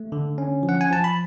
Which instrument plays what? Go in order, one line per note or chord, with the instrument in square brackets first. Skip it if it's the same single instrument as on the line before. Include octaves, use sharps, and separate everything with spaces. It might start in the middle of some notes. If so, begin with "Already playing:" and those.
Already playing: [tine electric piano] A3
D3
C#4
F3
F#5
G#5
F3 A5
B5